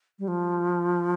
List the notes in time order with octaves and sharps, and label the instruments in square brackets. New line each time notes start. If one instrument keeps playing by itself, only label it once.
[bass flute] G3
F3